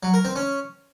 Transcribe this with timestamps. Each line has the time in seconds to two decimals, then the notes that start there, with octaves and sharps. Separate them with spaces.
0.03 F#3
0.14 A#4
0.25 C4
0.36 C#4